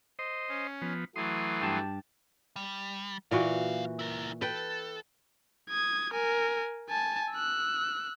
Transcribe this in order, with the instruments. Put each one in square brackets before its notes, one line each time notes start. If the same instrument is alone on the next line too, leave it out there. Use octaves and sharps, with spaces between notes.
[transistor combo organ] C5 D#5
[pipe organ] C#4
[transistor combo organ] F3 B3
[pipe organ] E3 F#3 A3 [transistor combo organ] C6 D#6
[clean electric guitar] G2 G4 A5
[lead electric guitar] G3
[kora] A#2 E3 F#4 [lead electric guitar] F#3 F5
[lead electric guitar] E4 A#4
[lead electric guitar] A4 [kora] B4 G5
[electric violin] D#6 G#6
A#4 G#5
G#5 A5
E6 F#6